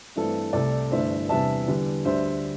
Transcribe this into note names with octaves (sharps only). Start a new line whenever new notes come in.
G2 E3 A3 C4 A4
C2 C3 A3 A4 D5
G1 G2 E3 A3 D4 C5 E5
E2 C3 G3 D4 E5 A5
E2 D3 G3
D2 D3 G3 D4 C5 E5